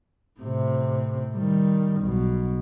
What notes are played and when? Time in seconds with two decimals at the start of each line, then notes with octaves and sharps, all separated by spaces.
0.40 A2 C3
1.34 D#3 G3
2.01 B1 B2